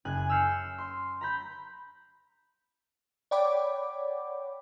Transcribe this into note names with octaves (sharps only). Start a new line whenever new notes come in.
F#1 G#5 F#6
E6 F6 G6 C7 C#7
C6
A#5 B5 G6
C#5 D5 F#5 G5 B5 D6